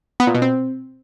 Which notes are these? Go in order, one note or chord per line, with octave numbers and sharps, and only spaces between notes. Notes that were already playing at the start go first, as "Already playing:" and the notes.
B3
A#2
B2
C4